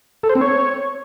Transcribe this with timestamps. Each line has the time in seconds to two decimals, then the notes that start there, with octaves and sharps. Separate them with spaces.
0.23 A4
0.29 C5
0.35 C4
0.41 C#5